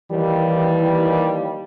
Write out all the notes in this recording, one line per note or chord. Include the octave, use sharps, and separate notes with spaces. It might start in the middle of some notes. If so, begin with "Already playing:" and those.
D#2 E3 G3